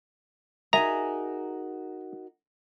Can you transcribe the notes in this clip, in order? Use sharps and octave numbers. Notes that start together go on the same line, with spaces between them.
D#4 F#4 G#4 A#4 E5 G#5 A#5